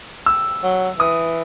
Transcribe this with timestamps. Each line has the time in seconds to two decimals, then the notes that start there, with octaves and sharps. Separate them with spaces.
0.26 E6
0.63 F#3
0.99 E3 D#6